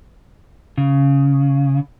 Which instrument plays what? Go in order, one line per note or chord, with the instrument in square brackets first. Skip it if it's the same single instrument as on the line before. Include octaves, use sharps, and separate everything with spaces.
[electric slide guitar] C#3